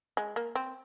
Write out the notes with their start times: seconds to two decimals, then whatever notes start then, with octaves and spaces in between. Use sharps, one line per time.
0.17 G#3
0.36 A#3
0.55 C4